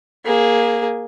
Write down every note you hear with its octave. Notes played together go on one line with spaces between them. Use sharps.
A#3 G#4